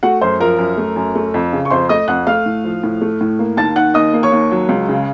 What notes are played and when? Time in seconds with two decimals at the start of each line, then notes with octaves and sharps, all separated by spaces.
0.03 A3 F#4 F#5
0.21 F#2 C5 C6
0.40 F3 A#4 A#5
0.58 F#2
0.78 A3
0.96 F#2
1.15 A3
1.34 F2
1.53 C#3
1.65 C#6
1.70 F2 C5 C6
1.89 A3 D#5 D#6
2.08 F2 F#5 F#6
2.27 A3 F5 F6
2.46 A2
2.64 F3
2.84 A2
3.01 A3
3.21 A2
3.39 A#3
3.57 D#2 A5 A6
3.76 D#3 F#5 F#6
3.94 D#2 D#5 D#6
4.13 A#3
4.23 C#5 C#6
4.32 D#2
4.51 F#3
4.69 C#2
4.89 C#3